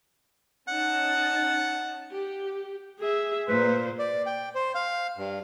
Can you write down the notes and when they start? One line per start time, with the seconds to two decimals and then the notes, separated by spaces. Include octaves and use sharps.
0.68 C#4 D#4 F#5 A5
2.12 G4
3.00 G#4 E5
3.48 A#2 B4 C5
3.99 D5
4.26 G5
4.55 C5
4.75 F5
5.18 G2